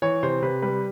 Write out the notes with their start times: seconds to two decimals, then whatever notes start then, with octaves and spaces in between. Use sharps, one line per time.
0.02 E3 C#5
0.23 C3 C5
0.42 C3 B4
0.62 G3 B4